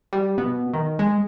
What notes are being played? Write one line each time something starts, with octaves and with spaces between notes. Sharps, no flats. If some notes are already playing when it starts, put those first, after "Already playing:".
G3
B2
D#3
G#3